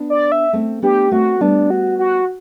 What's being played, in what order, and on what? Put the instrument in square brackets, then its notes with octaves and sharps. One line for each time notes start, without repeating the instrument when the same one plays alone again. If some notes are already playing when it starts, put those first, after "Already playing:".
Already playing: [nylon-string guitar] B3 D4
[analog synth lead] D5
E5
[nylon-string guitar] A3 C4
[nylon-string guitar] B3 D4 [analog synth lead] G4
[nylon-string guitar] A3 C4 [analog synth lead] F#4
[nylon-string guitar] G3 B3 [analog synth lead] D4
[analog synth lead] F#4
F#4